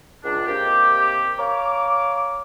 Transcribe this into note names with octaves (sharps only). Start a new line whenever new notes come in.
C#2 D4
C3 D#3 A#3 C4 G4
C#5 F5 A#5 D6